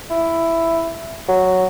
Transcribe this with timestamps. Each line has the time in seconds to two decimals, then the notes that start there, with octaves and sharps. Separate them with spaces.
0.10 E4
1.29 F#3